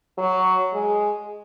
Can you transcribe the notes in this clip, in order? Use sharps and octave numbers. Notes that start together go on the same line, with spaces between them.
F#3
G#3